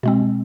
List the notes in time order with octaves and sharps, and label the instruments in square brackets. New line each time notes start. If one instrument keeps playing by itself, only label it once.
[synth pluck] B2 G#3 C4